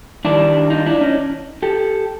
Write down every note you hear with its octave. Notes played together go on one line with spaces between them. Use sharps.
G2 D#3 G3 D4 E4
D#4 F4
D4 E4
C#4 D#4
G4 A4